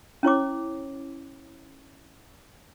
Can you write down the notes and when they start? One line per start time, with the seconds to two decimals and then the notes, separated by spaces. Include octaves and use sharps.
0.23 C#4 E4 C#5 D6